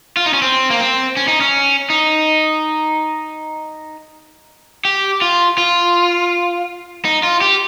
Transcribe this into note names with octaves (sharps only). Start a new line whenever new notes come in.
F4
D#4
C#4
C4
A#3
C4
C#4
D#4
C#4
D#4
G4
F4
F4
D#4
F4
G4